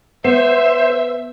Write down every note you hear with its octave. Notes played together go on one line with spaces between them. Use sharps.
B3 C5 E5